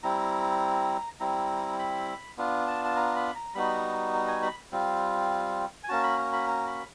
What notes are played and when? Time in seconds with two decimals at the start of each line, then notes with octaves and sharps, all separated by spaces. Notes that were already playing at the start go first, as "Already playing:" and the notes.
0.03 G3 C4 E4 A#5
1.20 G3 C4 E4 A#5
1.79 B5
2.38 B3 D4 F4
2.67 A5
2.85 A5
2.96 A#5
3.16 B5
3.35 A#5
3.55 G3 B3 D#4 F#4 B5
3.74 A#5
4.13 A#5
4.28 G#5
4.42 B5
4.72 G3 C4 F4
5.84 G#5
5.89 A#3 C#4 F#4 A5
6.03 B5
6.18 A#5
6.33 B5
6.48 A#5
6.67 B5